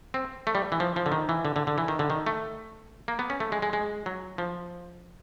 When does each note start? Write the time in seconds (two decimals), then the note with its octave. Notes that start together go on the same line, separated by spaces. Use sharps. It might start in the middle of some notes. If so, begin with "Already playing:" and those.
0.14 C4
0.47 A3
0.55 G3
0.72 E3
0.80 F3
0.96 F3
1.06 D3
1.12 D#3
1.29 E3
1.45 D3
1.56 D3
1.67 D3
1.78 E3
1.88 D#3
1.99 D3
2.10 D#3
2.26 A3
3.08 A#3
3.19 B3
3.30 C#4
3.40 A3
3.52 G#3
3.62 G#3
3.73 G#3
4.06 F#3
4.38 F3